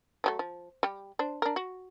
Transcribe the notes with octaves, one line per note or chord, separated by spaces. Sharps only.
F3 F#3 A3
F3
G3 G4
D4 C5
D4 A#4
F#4